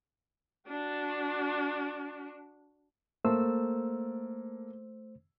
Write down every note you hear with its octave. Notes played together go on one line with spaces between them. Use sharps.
D4 F#4
A3 A#3 A4 C5 E6